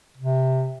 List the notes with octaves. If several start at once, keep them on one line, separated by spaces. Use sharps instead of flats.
C3